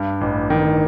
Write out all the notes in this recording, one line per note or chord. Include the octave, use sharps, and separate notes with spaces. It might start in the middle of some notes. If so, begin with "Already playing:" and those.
Already playing: G2
A1
D#3